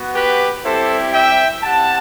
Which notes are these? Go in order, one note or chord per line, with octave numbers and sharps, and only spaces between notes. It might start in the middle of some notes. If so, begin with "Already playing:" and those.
Already playing: B3 F#4
G4 B4
G3 C4 E4 G4 A4 C5
E5 G5
C4 E4 G4 F#5 A5